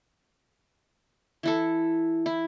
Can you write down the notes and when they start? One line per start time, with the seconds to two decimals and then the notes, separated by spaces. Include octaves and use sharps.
1.43 E3 E4 A4
2.26 E4